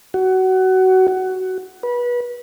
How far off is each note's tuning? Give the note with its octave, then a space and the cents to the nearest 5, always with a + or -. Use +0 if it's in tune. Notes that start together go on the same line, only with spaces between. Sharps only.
F#4 +20
F#4 +15
B4 -25